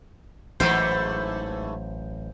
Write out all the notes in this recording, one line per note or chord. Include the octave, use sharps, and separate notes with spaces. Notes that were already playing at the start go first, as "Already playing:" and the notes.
A1 G#2 E3 F#3 A3 C5